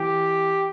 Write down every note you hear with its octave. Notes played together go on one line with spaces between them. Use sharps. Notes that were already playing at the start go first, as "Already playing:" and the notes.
Already playing: E3 G4